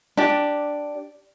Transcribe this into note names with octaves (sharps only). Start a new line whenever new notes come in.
D4 G4